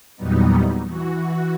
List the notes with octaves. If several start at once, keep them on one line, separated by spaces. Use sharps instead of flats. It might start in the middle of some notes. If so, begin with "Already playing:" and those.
E2 A#2 F#3 G3 B3 D#4
E3 F#4